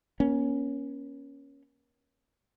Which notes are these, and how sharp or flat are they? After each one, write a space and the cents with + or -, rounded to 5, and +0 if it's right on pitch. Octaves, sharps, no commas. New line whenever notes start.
A#3 +40 C#4 +0